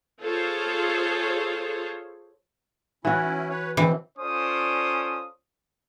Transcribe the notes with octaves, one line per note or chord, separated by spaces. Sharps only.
F4 G#4 A4 C5 C#5
E3 C#4 E4 F#4
B4 C#5
F#2 B2 E3 C4
C#4 F4 A4 C5 D5 D#6